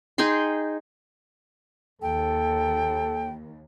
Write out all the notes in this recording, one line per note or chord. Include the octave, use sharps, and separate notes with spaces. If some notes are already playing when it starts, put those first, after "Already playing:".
D#4 G#4 G5 C6
D#2 A4 G5